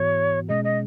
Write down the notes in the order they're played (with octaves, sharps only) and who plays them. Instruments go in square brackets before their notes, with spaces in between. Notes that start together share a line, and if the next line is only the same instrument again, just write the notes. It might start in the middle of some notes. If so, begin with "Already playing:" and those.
Already playing: [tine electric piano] G#2 E3 B3 F#4 [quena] C#5
[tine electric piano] B2 G#3 C#4 G#4 [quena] D#5
[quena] D#5